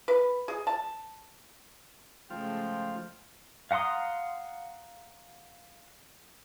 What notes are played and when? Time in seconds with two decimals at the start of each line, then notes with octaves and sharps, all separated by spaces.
0.08 B4
0.48 G#4
0.67 A5
2.30 C#3 F3 G#3 A3 F4 G5
3.71 F5 F#5 A#5 C6 D#6